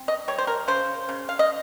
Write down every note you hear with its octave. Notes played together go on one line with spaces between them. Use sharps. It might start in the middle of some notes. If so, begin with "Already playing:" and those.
Already playing: C4
D#5
G3 C#5
C5
A#4
C#3 C5
C#3
F5
D#5